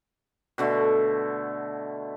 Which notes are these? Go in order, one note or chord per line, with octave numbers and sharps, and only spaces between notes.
B2 D3 A3